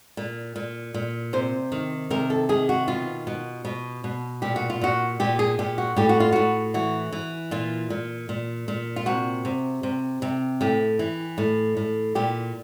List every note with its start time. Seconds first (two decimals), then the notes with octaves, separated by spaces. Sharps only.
0.17 A#2
0.56 A#2
0.94 A#2
1.33 C3 C5
1.72 D#3
2.10 C3 A#4
2.30 A4
2.49 D#3 G#4
2.69 F#4
2.88 B2 F4
3.27 B2
3.65 B2
4.04 B2
4.42 A#2 G4
4.56 F#4
4.70 F4
4.81 A#2 F#4
5.20 A#2 G4
5.39 G#4
5.59 A#2 G4
5.78 F#4
5.97 A2 G4
6.09 F#4
6.20 F4
6.32 A2 F#4
6.74 E3 F#4
7.12 E3
7.51 A#2 F4
7.90 A#2
8.29 A#2
8.68 A#2
8.96 F4
9.06 C3 F#4
9.45 C3
9.83 C3
10.22 C3
10.61 A2 G4
10.99 E3
11.38 A2
11.77 A2
12.15 A#2 G4